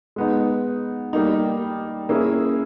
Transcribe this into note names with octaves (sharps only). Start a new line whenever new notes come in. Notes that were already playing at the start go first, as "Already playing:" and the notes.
G#3 B3 D#4
G3 A#3 D#4
A#3 C#4 E4 G#4